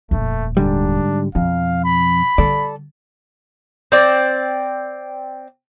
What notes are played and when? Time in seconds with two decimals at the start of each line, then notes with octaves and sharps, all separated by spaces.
0.11 D#1 F2 A3
0.57 G#2 D3 G3 D4
1.35 F2 B2 F3 F5
1.85 B5
2.38 D3 G3 A4 D5
3.92 C4 D5